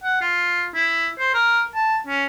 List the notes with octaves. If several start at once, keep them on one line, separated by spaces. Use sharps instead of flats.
F#5
F4
E4
C5
A#4
A5
C#4